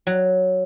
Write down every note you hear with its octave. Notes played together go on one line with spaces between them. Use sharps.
F#3